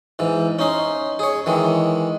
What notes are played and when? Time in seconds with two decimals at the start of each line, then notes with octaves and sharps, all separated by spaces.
0.19 G#2 E3
0.59 C#4 D#4 C6
1.19 G#4 C#5
1.46 D#3 E3 G#3